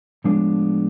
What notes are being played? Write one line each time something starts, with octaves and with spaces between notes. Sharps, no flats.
A2 F3 G#3 B3 D4